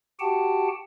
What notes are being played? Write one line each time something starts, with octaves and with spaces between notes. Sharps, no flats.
F#4 G4 F#5 G5 A5